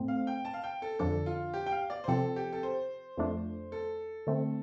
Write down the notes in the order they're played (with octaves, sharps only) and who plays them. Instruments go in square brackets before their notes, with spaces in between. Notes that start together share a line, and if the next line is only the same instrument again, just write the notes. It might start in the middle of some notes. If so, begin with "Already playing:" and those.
Already playing: [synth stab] A2 A3 C4
[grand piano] F5
G5
A5
F5
G5
A4
[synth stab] F2 D3 F3 D4 [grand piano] A4
[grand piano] F4
G4
G5
F5
D5
C5
[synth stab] C3 F3 C4 [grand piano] A4
[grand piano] G4
A4
C5
[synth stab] F2 F3 A3 D4
[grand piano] A4
[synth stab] D3 A3 C4